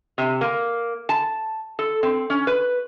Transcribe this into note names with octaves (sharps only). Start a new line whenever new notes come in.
C3
A#3
A5
A4
C4
C#4
B4